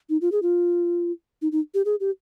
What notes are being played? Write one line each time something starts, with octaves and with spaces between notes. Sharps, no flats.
D#4
F4
G#4
F4
D#4
D#4
G4
G#4
G4